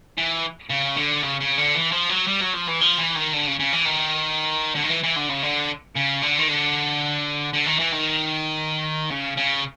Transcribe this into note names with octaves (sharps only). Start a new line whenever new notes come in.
E3
C#3
D3
C#3
C#3
D3
E3
F3
F#3
G3
F#3
F3
E3
F3
E3
D#3
D3
C#3
C#3
E3
D#3
D3
D#3
E3
E3
D3
C#3
D3
C#3
D3
D#3
D3
D3
D#3
E3
D#3
C#3
C#3